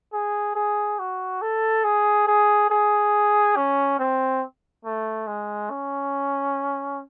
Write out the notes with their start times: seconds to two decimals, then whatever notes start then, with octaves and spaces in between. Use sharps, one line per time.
0.13 G#4
0.55 G#4
0.99 F#4
1.42 A4
1.84 G#4
2.28 G#4
2.70 G#4
3.56 C#4
3.99 C4
4.85 A3
5.27 G#3
5.70 C#4